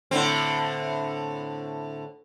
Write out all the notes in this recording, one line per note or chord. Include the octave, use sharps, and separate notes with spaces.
A2 D3 C4